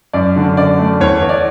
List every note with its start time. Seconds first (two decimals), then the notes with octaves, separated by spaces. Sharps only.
0.13 F#2 D5
0.36 D3
0.57 F#2 D5
0.79 A3
1.00 E2 C#5
1.22 E2
1.29 D5